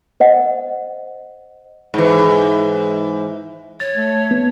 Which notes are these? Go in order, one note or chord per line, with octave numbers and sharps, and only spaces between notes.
C5 D#5 F#5
G#2 E3
C#5 A6
A3
B3